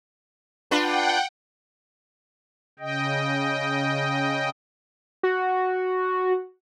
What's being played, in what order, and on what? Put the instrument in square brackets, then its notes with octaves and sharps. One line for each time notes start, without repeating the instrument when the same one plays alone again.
[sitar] D4 F4 B4 [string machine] F#5 G5
[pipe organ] C#3 D#5 G5
[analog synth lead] F#4